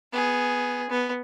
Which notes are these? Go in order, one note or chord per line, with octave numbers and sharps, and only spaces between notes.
B3 G#4
B3